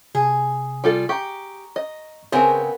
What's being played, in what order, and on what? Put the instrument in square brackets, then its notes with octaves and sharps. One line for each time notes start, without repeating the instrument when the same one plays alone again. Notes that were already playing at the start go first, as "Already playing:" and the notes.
[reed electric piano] C3 [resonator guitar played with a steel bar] G#4
[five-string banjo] G3 F4 A4
[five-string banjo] G4 [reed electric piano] A#5 C#6
[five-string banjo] D#5
[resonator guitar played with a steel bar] C#3 C4 G#5 [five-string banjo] B3 A#4 [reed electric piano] G#4 C5